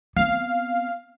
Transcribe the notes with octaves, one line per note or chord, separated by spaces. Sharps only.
B3 C4 F5